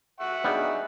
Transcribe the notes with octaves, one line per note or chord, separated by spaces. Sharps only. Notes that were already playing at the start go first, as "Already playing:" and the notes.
E5 F#5 C#6
G3 B3 D4 D#4 G#4